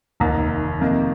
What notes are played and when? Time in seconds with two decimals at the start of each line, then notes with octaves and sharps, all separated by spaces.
0.20 F1 D#2 D#3 A#5
0.80 F2 C3 D#3 A#3